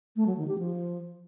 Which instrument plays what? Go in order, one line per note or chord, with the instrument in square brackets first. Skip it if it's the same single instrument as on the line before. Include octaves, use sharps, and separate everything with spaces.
[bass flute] A3
F#3
D#3
G4
F3